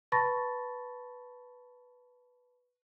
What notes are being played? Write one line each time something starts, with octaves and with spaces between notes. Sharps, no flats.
B4 A5 B5 C#6 A6 A#6